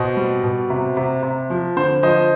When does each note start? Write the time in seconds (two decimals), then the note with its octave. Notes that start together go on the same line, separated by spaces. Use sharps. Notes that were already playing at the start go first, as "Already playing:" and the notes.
Already playing: B2 C5 D#5
0.17 G3
0.43 B2
0.70 C3
0.97 C3
1.23 C3
1.50 F3
1.77 D3 C5
2.03 F3 C5 D#5